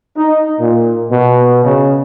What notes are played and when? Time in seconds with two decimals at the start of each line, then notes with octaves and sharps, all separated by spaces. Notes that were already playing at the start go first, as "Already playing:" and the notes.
0.16 D#4
0.59 A#2
1.10 B2
1.63 C#3